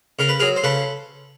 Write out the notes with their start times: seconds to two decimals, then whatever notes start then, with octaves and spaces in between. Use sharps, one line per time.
0.19 C#3 A#4
0.29 B4
0.40 F#3 G#4 A#4
0.56 C5
0.64 C#3 A4 B4